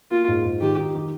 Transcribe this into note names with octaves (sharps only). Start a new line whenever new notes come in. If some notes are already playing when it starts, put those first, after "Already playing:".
A#3 F4
G#2
G#2
D#3 G4
D#4
D#3